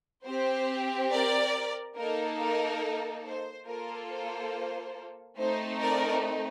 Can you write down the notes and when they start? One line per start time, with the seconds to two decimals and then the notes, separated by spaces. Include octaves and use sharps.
0.25 C4 G4 C5
1.10 A#4 D5
1.96 A#3 D#4 A4 A#4
2.39 A#4
3.25 C5
3.66 A#3 F4 A4 A#4
4.10 C5
5.38 A3 C4 D#4 C5
5.81 A#4 D5